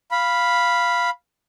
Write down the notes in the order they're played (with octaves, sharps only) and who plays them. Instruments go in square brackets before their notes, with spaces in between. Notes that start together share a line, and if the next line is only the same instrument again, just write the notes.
[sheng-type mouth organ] F5 B5